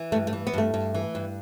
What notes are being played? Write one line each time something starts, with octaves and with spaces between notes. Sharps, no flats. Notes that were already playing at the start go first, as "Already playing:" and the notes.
Already playing: E3
G2 A3
A3
E3
B3
G2 A3
G2
E3
G2